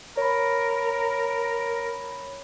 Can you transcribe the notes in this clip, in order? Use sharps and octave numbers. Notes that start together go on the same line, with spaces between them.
A#4 C#5 B5